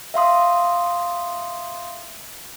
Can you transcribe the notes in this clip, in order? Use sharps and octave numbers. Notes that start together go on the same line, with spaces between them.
E5 F5 C6 D#6